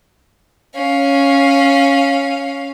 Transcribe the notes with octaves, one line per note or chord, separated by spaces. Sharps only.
C#4 F5